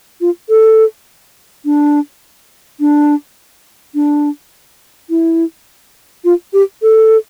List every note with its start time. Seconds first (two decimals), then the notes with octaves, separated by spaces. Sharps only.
0.21 F4
0.49 A4
1.65 D4
2.80 D4
3.95 D4
5.10 E4
6.24 F4
6.53 G4
6.82 A4